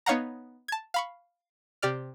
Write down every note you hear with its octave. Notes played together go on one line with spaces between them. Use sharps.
B3 D#4 C#5 F5 F#5 A#5
A5 G#6
F5 B5 C#6
C3 G4 D5 F6